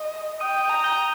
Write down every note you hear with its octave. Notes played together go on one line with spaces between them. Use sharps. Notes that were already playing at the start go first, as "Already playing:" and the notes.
Already playing: D#5
G5 D#6 D#7
A#5
G6 G7